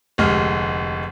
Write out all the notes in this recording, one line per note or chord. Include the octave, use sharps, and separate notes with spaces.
F1 D2 G#3 F6